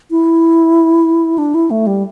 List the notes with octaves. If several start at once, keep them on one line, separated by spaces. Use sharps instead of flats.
E4
D4
E4
A3
G3